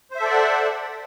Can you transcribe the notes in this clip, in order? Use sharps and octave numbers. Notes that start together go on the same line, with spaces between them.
A4 C5 D5 E5 F#5